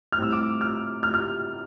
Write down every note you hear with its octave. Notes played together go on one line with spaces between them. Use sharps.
F6
A2 G3 C4 E6
D6
F6
F6
F6